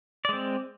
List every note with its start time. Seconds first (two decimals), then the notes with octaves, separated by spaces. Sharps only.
0.25 D5
0.29 G#3
0.33 C4